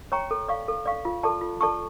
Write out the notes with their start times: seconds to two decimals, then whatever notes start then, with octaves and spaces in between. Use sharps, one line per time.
0.12 C#5 G5 A#5 C#6
0.31 A4
0.48 D5 F5 C#6
0.68 A4
0.86 D5 F5 C#6
1.05 F4
1.23 A4 D5 A5 C#6
1.41 F4
1.61 A4 D5 A5 C#6